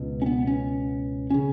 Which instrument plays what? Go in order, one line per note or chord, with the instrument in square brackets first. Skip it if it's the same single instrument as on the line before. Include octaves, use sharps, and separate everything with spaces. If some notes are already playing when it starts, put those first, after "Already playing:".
Already playing: [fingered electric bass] C#2 B2
C#4
B3
C#4
C#3 C#4